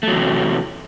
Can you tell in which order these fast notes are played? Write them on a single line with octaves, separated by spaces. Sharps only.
A3 F#3 E2 C3